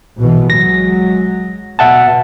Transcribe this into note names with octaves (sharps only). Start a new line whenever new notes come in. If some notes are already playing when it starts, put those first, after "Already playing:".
A#1 B2 E3
F#3 G#3 A#6
B2 E5 F#5 A5